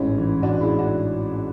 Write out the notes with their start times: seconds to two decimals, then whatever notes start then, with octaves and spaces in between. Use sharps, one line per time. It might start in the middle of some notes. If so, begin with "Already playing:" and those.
Already playing: A1 G#2 C#4 E4
0.18 E3
0.42 A1 D4 F#4
0.61 E4 G#4
0.67 G#2
0.79 D4 F#4